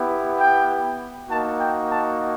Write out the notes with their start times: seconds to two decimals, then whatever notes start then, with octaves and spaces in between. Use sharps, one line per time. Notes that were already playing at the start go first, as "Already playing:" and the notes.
Already playing: B3 E4 G4
0.38 G5
1.29 A#3 D#4 F#4 A5
1.60 G5
1.90 A5